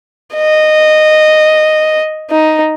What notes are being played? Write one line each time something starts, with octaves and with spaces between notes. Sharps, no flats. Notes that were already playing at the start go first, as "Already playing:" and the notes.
D#5
D#4